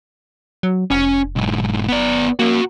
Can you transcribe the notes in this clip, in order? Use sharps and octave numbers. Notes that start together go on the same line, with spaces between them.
F#3
F1 C#4
B1 G#2
B3 D5
A#3 F#4 A#4